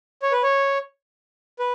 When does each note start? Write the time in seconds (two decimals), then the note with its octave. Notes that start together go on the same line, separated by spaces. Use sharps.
0.22 C#5
0.32 B4
0.43 C#5
1.59 B4